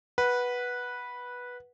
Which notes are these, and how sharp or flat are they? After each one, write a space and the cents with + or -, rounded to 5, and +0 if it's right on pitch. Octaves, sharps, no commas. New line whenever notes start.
B4 -10 F#5 +0